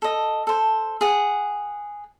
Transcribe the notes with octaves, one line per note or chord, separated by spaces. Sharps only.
A4 D#5
A4 C5
G#4 F#5